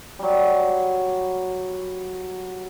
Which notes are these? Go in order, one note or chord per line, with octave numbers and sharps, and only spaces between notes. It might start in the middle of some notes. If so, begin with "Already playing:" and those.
F#3 G3